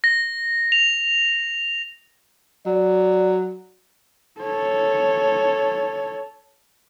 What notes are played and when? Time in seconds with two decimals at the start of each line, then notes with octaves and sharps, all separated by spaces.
0.04 A#6
0.72 F7
2.66 F#3 D5
4.41 A4 C#5